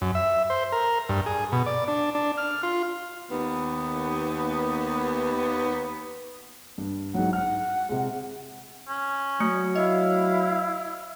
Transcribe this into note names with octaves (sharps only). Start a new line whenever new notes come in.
F#2
E5
C5
A#4
G2
G#4
B2
D5
D4
D4
F6
F4
D#2 B3
G2
G#2 F#3 F#5
F#5 F6
C3 G#3
C#4
F#3 A3 C#7
E4 D#5 F5